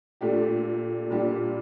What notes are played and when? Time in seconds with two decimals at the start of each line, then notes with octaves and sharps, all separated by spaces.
0.21 A#2 A3 D4 G4
1.10 A#2 G3 A#3 D4 G4